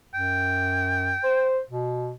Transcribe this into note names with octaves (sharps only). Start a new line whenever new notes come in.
F#2 G5
C5
B2